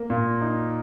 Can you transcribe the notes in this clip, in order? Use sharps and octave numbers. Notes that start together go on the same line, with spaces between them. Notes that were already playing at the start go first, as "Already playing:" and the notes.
Already playing: A#3 A#4
A#2
D#4